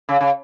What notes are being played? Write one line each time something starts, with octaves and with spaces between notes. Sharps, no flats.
C#3
C#3